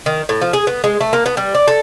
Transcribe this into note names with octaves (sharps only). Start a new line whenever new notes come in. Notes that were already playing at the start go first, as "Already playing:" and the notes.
D#3
A2
F3
G#4
B3
G#3
A3
A#3
B3
G3
D5
A4